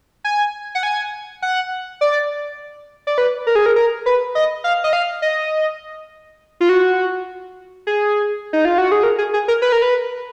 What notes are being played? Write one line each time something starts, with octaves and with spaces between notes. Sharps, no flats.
G#5
F#5
G#5
F#5
D5
D5
B4
A#4
G#4
A#4
A#4
B4
D#5
F5
D#5
F5
D#5
F4
F#4
G#4
D#4
F4
F#4
G#4
A#4
G#4
G#4
A#4
B4
A#4
B4